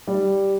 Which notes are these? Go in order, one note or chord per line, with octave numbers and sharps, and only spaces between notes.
G3